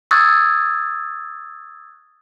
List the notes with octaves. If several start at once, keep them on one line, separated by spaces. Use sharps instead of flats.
C#6 D#6 E6 F#6 G#6 A6